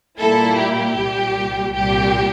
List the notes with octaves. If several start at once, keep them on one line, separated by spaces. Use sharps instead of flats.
A#2 G3 A#3 E4 A4
G4
C2 A#2 G3
C2 A#2 G3 G4